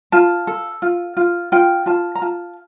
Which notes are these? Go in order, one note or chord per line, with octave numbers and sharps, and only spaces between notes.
F4 A5
A4
F4
F4
F4 G5
F4 A5
A#5
F4 A5